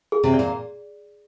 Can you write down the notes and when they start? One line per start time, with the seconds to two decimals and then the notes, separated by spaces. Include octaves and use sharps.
0.12 G#4
0.23 C3 C4
0.34 D5
0.39 A#2 A#3